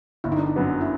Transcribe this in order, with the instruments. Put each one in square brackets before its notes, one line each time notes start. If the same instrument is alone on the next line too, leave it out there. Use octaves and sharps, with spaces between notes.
[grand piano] G1 [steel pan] E4
[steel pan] D#4
D4
D#4
[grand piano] F#2 D3 F#3 B3
[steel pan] E4